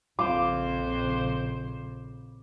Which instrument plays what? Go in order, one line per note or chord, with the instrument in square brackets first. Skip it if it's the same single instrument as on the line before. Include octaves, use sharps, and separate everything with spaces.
[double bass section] A#1 C#3 [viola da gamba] F2 C5 [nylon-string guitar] F4 [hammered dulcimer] D6